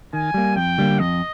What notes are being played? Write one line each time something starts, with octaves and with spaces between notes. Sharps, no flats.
D#3 G#5
G3 A#3
F2 G5
D3 G3 A#3
F2 D#5